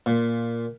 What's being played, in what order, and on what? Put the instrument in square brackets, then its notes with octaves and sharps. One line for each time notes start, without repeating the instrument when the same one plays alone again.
[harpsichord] A#2